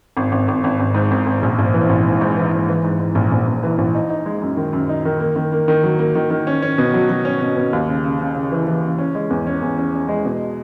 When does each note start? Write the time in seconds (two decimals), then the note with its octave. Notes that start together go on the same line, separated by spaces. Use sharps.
0.17 G#1
0.32 G#1
0.48 G#1
0.64 G#1
0.80 G#1
0.94 G#2
1.11 G#1
1.26 G#1
1.42 A#1
1.59 A#1
1.74 E3
1.89 A#1
2.05 G#2
2.21 G#2
2.37 E3
2.52 G#2
2.69 E3
2.84 G#2
3.00 G#2
3.15 A#1
3.32 A#1
3.47 A#1
3.63 E3
3.78 A#1
3.95 D#4
4.10 D#4
4.26 G#3
4.42 F#2
4.57 D#3
4.73 F#2
4.89 D#4
5.05 D#3
5.20 A#3
5.36 D#3
5.52 A#3
5.68 D#3
5.84 F#3
5.99 A#3
6.15 D#3
6.30 D#3
6.47 C#4
6.62 C#4
6.78 B2
6.94 F#3
7.09 F#3
7.25 C#4
7.41 B2
7.56 B2
7.73 D#2
7.89 C#3
8.04 C#3
8.20 C#3
8.35 C#3
8.52 E3
8.67 E3
8.83 C#3
8.99 C#4
9.15 G#3
9.30 E2
9.47 C#4
9.62 E2
9.78 C#4
9.94 C#4
10.09 G#3
10.25 B2